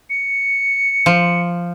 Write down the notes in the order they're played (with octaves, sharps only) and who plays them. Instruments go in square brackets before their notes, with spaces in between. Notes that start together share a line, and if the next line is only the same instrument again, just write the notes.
[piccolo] C#7
[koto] F3